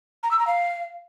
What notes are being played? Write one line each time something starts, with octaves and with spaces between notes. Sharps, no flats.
A#5
E6
A#5
F5